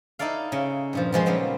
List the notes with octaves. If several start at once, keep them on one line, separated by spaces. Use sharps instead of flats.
D#4 E4 A4 D5 F5
C#3
G2 A#2 F3
B2 F3 G#3 C6
A#2 C#3 G3 B3 C4